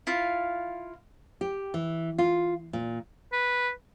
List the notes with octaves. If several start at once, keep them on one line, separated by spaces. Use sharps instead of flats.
E4 F4 F5
G4
E3
F4
A#2
B4